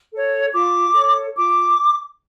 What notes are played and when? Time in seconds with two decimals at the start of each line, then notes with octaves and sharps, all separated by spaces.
0.13 A4 C#5
0.53 F4 D6
0.95 A4 C#5
1.36 F4 D6